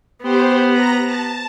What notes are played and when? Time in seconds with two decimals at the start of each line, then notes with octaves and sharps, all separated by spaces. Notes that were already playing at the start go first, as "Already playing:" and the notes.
0.23 B3 G4 C5
0.70 A#5 A#6
1.04 A5